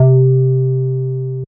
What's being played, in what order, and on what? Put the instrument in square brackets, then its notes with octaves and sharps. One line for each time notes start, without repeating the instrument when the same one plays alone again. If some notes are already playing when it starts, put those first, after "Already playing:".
Already playing: [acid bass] C3